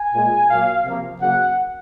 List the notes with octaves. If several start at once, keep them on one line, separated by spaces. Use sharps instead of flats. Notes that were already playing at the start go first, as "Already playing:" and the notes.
Already playing: G#5
A#2 G#3
A#2 F#3 A#3 F5
C3 F3 A#3
C#3 F#3 A#3 F#5